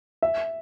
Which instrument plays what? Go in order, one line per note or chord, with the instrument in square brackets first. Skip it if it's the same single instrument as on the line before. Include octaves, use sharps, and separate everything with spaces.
[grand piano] E5